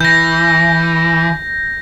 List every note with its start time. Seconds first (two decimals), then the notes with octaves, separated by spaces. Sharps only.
0.01 E3 G6 A#6